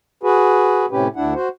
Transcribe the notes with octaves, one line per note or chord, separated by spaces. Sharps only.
F#4 G#4 B4
A2 C3 C#4 G4 B4
D2 D4 E4 F#5
F#4 C5